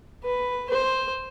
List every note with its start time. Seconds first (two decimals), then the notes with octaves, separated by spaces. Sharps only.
0.25 B4
0.70 C5